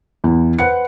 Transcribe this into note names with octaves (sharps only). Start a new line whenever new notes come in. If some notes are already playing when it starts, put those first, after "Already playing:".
E2 E4
B4 C5 F#5 F#6 C#7